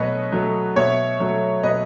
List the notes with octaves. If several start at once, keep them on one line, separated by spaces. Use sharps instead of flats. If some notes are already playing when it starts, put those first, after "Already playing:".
Already playing: B2 F#3 A3 B4 C#5 D#5
F#3 A3
B2 C#5 E5
F#3 A3
B2 B4 D#5